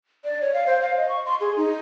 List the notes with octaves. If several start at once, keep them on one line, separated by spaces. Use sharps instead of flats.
D5
C#5
F5
C5
F5
D#5
C#6
C6
G#4
D#4